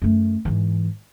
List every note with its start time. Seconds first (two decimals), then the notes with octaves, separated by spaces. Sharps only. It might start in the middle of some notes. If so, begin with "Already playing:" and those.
0.02 F#2 A3
0.45 G#2 E3